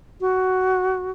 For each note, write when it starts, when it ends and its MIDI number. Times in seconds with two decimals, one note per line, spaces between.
0.21 1.11 66